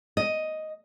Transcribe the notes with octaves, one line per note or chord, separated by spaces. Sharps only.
D#5